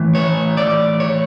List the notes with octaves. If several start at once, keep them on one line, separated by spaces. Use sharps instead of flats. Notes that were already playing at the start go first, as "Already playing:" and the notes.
Already playing: A2 E3
C#5
D5
C#5